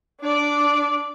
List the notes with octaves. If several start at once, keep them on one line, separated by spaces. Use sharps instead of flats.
D4 D5